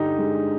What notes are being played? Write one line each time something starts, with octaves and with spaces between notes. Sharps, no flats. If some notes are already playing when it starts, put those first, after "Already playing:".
Already playing: G2 D3 D#4 G4
G#3